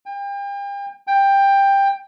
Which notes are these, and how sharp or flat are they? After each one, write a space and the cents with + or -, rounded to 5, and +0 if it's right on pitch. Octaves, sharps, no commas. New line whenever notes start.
G5 +40
G5 +15